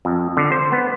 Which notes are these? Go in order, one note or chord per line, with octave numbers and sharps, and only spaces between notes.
F2
D3
C5
B3